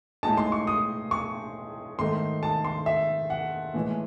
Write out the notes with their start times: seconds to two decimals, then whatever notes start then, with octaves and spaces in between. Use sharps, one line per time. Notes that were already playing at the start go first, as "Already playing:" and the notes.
0.23 A2 G#3 D#4 A5
0.37 C6
0.52 C#6
0.67 D#6
1.11 C#6
1.99 G#2 D#3 A3 D#4 C6
2.43 A5
2.65 C6
2.86 E5
3.30 F#5
3.74 A2 E3 G#3